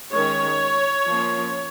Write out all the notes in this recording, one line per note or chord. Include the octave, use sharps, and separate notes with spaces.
D#3 G#3 C#4 C#5
F3 A#3 C#4